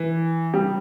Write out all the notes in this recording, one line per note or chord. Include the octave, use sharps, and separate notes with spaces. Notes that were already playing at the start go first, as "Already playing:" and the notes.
Already playing: E3
G3